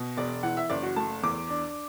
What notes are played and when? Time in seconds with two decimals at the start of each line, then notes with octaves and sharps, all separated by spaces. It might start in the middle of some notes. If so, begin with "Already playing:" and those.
Already playing: B2
0.17 E1 D5
0.43 E3 F#5
0.57 E5
0.70 F#1 D5
0.83 F#4
0.96 A3 A5
1.23 E2 D6
1.49 D4